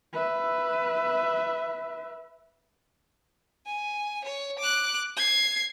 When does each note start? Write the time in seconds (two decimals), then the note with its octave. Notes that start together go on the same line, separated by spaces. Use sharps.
0.13 B4 E5
3.66 G#5
4.25 C#5
4.59 D6 F#6
5.17 G#6 C7